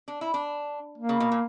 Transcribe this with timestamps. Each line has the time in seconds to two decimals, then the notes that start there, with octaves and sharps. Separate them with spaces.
0.08 D4
0.21 E4
0.34 D4
0.98 A#3
1.09 C#3
1.20 B2
1.32 A#2